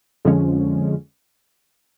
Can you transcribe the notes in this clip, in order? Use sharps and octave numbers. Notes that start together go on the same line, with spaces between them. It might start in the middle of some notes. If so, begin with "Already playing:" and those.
F2 D3 F3 G#3 C#4